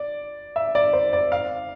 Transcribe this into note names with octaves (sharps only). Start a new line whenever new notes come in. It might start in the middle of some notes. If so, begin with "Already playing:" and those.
Already playing: D5
E5
D5
C5
D5
F5